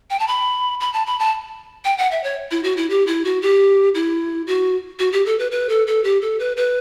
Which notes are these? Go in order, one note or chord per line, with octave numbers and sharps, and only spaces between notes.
G5
A5
B5
B5
A5
B5
A5
G5
F#5
E5
C#5
E4
F#4
E4
G4
E4
F#4
G4
E4
F#4
F#4
G4
A4
B4
B4
A4
A4
G4
A4
B4
B4